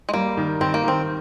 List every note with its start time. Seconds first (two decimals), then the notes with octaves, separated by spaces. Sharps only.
0.09 G#3
0.14 G3 A#3
0.37 D#3
0.61 D#3 C4
0.74 A#3
0.84 D#3 C4